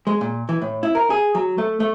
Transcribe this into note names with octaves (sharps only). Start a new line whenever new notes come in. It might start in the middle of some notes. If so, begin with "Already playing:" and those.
G#3
A#2
E3
A2
E4
A#4
G#4
F#3
A3
A3